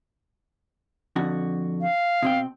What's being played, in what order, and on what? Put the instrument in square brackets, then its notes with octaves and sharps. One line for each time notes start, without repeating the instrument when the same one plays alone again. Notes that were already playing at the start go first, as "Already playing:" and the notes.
[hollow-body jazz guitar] F2 D3 F#4
[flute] F5
[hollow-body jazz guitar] B2 C4 G5